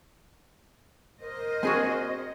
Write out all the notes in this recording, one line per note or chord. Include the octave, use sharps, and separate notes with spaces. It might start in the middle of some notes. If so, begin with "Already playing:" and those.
A#4 C5 D#5
A#3 C4 D4 F#4 G#4 G#5